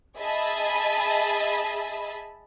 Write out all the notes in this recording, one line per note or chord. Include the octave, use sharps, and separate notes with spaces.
G#4 D#5 E5 A5 B5